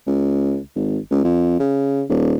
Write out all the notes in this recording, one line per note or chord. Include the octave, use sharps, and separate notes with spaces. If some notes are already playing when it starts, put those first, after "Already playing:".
C#2
G#1
C#2
F2
C#3
D#1